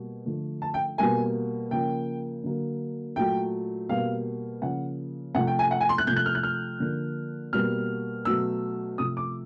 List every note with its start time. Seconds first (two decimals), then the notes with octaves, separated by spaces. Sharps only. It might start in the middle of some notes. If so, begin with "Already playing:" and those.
Already playing: B2 G3 A#3
0.25 D3 F3 A3
0.62 A5
0.74 G5
0.98 B2 G3 A#3 G#5
1.71 C#3 F3 A#3 G5
2.44 D3 F#3 A#3
3.16 A#2 F#3 A3 G5
3.89 B2 G3 A#3 F5
4.62 C#3 F3 A#3 F#5
5.35 C3 F3 A3 F#5
5.47 G5
5.59 G#5
5.71 F#5
5.81 G#5
5.89 C6
5.98 F#6
6.07 C3 F3 A3 G6
6.16 F#6
6.26 F6
6.35 F#6
6.43 F6
6.80 D3 F3 A#3
7.53 B2 G3 A#3 F6
8.25 B2 F#3 A3 E6
8.98 C3 F3 A3 D#6
9.17 D6